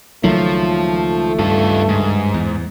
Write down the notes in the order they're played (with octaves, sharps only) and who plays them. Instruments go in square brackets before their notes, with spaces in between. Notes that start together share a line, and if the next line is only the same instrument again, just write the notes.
[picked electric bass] C#2 D#3 [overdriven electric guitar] F3 [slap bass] F#3 [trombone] A3
[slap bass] G2 [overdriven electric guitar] F4 A4
[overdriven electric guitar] G#2
[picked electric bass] E2